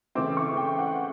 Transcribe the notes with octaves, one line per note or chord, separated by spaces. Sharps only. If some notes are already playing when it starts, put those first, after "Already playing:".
C#3 E3 A3 C4 D6
C#6
G5
F#5